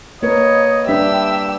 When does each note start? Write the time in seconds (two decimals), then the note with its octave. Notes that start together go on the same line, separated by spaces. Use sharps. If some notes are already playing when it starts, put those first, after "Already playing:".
0.22 A#3 A#4 B4 C#5 D#5
0.88 G3 D4 G4 B4 E5 E6